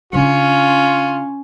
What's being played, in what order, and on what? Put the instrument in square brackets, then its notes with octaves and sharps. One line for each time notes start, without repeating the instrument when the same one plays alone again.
[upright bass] C#3 D4 [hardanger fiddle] C#4 [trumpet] F4